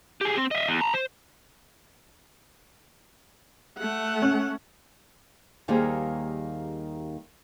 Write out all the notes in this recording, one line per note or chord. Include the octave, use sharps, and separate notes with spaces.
G4 G#4
C4
D#5 E5
E2
A5 A#5
C5
A3 F#5
C#4
D#2 D#3 G3 A#3 G#4 C5